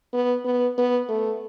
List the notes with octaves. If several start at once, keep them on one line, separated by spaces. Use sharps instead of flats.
B3
B3
B3
A3